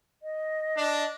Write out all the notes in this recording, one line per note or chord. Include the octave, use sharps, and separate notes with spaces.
D#5
D4